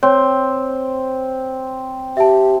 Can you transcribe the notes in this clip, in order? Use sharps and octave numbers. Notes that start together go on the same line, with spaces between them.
C4 C#5
G4 E5 A5